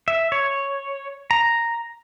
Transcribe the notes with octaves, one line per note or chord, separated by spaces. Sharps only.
E5
C#5
A#5